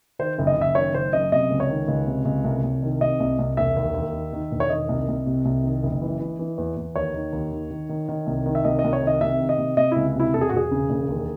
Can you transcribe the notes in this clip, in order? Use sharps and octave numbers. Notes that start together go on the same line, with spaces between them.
D#3 C5
F#1
D#5
F#1 E5
D#3 C#5
F#1 C5
F#2 D#5
C3 D#5
C#2
C#5
D#3
C#2
C3
C#2
C2
C2
D#3
C3 D#5
C2
C2
E1 E5
D#2
D#2
D#3
D#3
E1
C#5
D#3 D#5
C2
C2
C3
C2
D#3
F#1
E3
E3
E3
E2
E2
D#2 C#5
D#3
D#2
D#3
D#3
D#3
D#3
C2
D#3
E5
C2 D#5
D#5
C2
C#5
D#3
D#5
C3 E5
D#3
D#5
C3
C3 D#5
C#2 E4
C3 E4
E1 A4
G#4
F#4
E1 G#4
C#3
E1
D#2